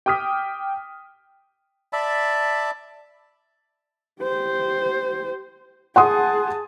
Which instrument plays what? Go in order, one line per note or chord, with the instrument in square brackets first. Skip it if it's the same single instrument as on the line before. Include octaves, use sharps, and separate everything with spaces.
[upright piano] G5 D6 D#6 F6 B6
[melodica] D5 E5 A5 B5
[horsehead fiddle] G4 C5
[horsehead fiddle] G#4 A5 [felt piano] F#5 C6 D#6